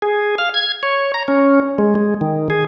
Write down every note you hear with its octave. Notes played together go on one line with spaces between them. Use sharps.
G#4
F5
G#6
C#5
A#5
C#4
G#3
G#3
D#3
G#4